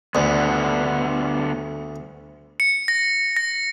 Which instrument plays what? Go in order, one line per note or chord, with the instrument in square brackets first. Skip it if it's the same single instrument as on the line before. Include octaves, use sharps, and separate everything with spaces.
[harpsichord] D2 [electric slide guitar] D3 B3
[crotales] C#7
A#6
A#6